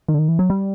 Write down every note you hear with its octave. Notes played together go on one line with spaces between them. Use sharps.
D#3
D3
D#3
E3
F#3
G3